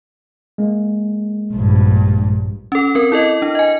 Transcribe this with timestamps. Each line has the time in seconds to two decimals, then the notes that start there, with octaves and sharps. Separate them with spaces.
0.58 G#3 A#3
1.53 A#1 G2
2.72 C#4 A4
2.95 C4 A#4
3.12 E4 A4 D#5
3.42 D4
3.55 D#5 G#5